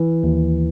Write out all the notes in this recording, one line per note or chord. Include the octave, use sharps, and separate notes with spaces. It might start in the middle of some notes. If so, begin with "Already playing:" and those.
Already playing: E3
D#2